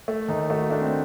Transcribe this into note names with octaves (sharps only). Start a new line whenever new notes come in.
A3
D#2 D#4
A3 F#4
A3 D4
C4